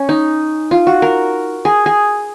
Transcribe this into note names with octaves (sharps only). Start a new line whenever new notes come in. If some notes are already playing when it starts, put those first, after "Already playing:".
Already playing: C#4
D#4
F4
F#4
A#4
G#4
G#4